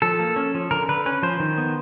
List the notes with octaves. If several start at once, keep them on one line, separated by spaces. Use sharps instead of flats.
F3 A4
A#3
C#4
F3
D3 A#4
D3 B4
C#4 B4
F3 C5
D#3
B3